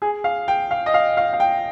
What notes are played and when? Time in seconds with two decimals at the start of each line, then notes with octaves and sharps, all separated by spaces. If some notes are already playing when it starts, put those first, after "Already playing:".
0.02 G#4
0.24 F5
0.48 G5
0.71 F5
0.86 D#5
0.94 F5
1.17 F5
1.33 F5
1.40 G5